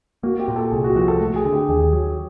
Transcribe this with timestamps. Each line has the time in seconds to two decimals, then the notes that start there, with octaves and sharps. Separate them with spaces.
0.23 A#3 F#4
0.40 G4
0.48 A#2
0.56 A4
0.71 C2 G#4
0.84 F#4
0.96 F3 F#4
1.08 A4
1.20 A3
1.36 G#4
1.45 D3
1.53 G4
1.69 D#2 G#4
1.93 F#3